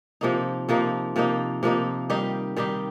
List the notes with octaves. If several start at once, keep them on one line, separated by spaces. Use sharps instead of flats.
C3 F3 A#3 D#4
C3 F3 A#3 D#4
C3 F3 A#3 D#4
C3 F3 A#3 D#4
D#3 G3 D#4 G4
D#3 G3 D#4 G4